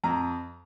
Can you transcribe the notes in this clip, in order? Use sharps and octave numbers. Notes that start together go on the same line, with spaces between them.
F2 A#5